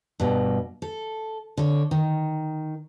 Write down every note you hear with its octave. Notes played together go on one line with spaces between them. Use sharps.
G2 B2
A4
D3 C#5
D#3